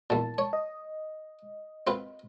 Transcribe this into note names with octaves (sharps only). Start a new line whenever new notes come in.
E2 A#2 A5
C#5
D#5
C4 F4 B4